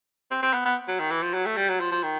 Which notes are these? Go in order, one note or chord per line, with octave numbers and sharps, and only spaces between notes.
C4
C4
B3
B3
F#3
D#3
E3
F3
F#3
A3
G3
F#3
F3
F3
D#3